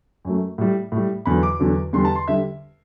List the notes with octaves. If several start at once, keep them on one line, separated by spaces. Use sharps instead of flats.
F#2 F#3 A3
A2 G3
A2 G3
E2 D3 F#3 B5
D6
E2 D3 F#3
E2 D3 G3 C6
A5
C6
D3 G3 E5